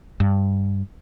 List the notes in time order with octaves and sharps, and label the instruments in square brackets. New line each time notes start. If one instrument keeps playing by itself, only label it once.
[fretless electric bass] G2